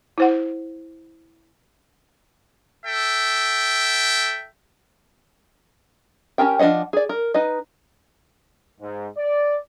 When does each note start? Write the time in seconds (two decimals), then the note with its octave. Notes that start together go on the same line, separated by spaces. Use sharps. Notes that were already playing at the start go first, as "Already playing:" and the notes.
0.18 E4 C5 F#5
2.85 A4 E5 G5
6.38 C#4 G4 G#4 A#4 G5
6.59 F3 D4 C5 D#5 F#5
6.93 G#4 D5
7.09 A#4
7.34 D#4 B4 D#5
8.81 G#2
9.17 D5